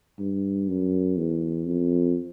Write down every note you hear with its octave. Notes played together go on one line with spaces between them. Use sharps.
G2
F#2
E2
F2